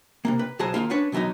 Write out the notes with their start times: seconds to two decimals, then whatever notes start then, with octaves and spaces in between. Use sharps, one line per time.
0.25 C3 D#3 A#3
0.39 B4
0.59 B1 F#3 G#4 C5 A5 A#5
0.74 D#2 D#3 A#3 F4
0.90 C#4 D4 B4 C#5
1.12 B2 E3 F#3 B3 D#4